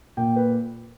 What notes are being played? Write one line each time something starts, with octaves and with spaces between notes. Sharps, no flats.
A#2 G5
B4